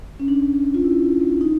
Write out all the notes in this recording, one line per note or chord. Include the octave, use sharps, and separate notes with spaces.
C#4
D4
F4
E4
D#4